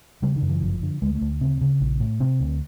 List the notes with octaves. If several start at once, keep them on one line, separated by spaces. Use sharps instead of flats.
C#3 G3
D#3
F#2
E3
G1 F3
D3
D2 G#3
A3
D2
C#3 C4
C#3
A#1
A2
C3 C4
D2